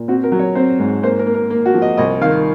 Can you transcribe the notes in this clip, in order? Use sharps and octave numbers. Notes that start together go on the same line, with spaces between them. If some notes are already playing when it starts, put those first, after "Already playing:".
Already playing: A#2
C4 F#4
A#4
F#3
C#5
C4 C5
G#2
A#3 C5
A#4
A#3
A#4
A#3
F#4
F3
D#5
C2 D#5
D#3 F5